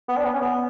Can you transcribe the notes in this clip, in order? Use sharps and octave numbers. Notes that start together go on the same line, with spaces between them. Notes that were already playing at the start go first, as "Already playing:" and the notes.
B3
D4
B3
C#4
B3